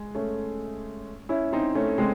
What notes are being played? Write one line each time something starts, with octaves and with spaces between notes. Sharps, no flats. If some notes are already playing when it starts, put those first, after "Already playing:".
Already playing: G#3
A3 C#4
C#4 E4
C4 D#4
A3 C#4
G#3 C4